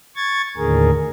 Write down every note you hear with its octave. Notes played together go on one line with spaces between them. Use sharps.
C#6 G#6 A6
D#2 A2 D3 G#4 A#4